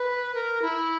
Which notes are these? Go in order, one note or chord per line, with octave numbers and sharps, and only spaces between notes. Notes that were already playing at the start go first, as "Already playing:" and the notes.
Already playing: B4
A#4
E4